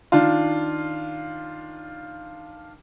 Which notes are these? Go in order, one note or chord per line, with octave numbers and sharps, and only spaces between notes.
D#3 D4 F4